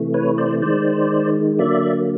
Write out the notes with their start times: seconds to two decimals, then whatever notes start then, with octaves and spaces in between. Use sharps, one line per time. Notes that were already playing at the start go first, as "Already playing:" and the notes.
Already playing: C3 E3 A3
0.14 B4 C#5
0.38 C5 D5
0.62 D#3 G#3 C5 D5
1.59 D3 F#3 A#3 D5 E5